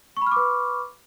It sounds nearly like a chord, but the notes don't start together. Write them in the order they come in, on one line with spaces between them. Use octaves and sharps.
C#6 B5 F6 D6 B4